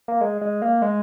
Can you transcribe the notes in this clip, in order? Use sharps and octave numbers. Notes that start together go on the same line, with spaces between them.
A#3
G#3
G#3
A#3
G#3